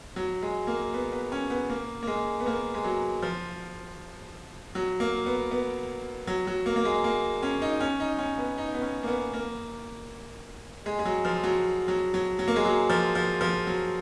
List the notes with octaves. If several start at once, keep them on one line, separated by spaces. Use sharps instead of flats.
F#3
G#3
A#3
B3
B3
C#4
B3
A#3
A#3
G#3
B3
A#3
G#3
F#3
F3
F#3
A#3
B3
B3
F#3
F#3
A#3
A#3
G#3
A#3
C#4
D#4
C#4
D#4
C#4
B3
D#4
B3
C#4
A#3
B3
A#3
G#3
G#3
F#3
F3
F#3
F#3
F#3
F#3
A#3
G#3
F#3
F3
F3
F3
F#3